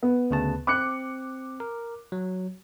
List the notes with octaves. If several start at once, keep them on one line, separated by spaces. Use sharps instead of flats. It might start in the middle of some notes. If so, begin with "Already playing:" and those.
B3
D2 C#3 A5
C4 D6 F#6 C#7
A#4
F#3